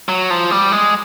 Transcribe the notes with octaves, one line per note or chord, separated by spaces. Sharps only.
F#3
F3
G3
G#3